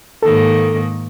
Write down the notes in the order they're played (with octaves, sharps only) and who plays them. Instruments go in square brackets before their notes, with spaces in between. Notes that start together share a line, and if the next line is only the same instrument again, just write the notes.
[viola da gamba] G#2 D#3 A#3 [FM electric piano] A4